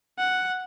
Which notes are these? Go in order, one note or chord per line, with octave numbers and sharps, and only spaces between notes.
F#5